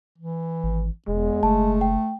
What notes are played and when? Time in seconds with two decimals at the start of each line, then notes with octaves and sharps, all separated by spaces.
0.18 E3
0.64 G#1
1.08 E1 E2 G#3
1.43 F#1 A3 A5
1.81 G5